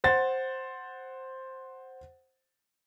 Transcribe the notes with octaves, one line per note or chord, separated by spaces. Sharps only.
C5 F#5 A6